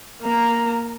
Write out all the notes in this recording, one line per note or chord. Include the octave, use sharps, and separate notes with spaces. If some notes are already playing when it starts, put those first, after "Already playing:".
A#3 A#5